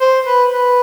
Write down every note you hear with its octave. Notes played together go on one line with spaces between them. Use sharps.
C5
B4
B4